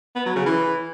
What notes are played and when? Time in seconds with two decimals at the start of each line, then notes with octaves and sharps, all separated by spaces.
0.15 B3
0.26 F#3
0.36 C#3
0.46 E3